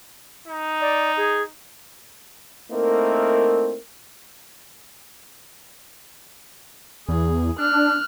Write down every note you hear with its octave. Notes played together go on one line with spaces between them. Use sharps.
D#4
D5
G#4
A3 A#3 C4 D#4 E4 A#4
E2 G#4
D4 F6 F#6